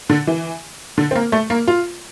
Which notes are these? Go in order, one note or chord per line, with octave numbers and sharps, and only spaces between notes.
D3
E3
D3
C4
A#3
A3
A#3
F4